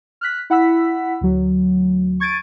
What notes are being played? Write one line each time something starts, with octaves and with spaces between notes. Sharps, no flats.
F6 F#6 B6
E4 F#5 B5 E6 B6
D2 F#3
C#6 G#6 A6 D7 D#7